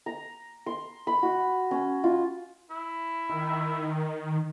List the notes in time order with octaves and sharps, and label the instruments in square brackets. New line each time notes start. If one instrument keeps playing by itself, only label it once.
[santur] A#5
C6
B5
F#4
C#4
F4
[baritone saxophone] E4
[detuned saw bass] D#3